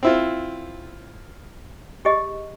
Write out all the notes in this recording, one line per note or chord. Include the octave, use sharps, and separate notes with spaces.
C4 E4 F4
G4 G#4 D#5